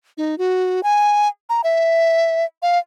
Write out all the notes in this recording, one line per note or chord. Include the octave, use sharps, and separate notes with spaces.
D#4
F#4
G#5
A#5
E5
F5